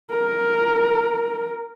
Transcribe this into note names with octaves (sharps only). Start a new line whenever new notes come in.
A#4